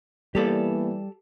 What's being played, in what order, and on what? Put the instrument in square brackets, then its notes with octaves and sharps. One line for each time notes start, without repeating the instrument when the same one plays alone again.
[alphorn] E3 [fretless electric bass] G3 [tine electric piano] A#3 B3 [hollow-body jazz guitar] G4 A4 D5